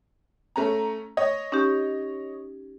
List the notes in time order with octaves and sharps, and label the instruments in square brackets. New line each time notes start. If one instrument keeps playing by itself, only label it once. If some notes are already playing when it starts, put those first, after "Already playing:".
[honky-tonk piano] A3 C#4 A#5
C#5 D#5
[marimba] C#4 D#4 G4